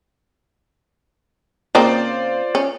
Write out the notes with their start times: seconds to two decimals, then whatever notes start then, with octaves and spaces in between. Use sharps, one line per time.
1.75 C#3 A#3 C4 F4 C5 D5
2.55 C#4